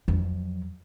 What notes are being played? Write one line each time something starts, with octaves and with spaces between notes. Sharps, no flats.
F2 F#3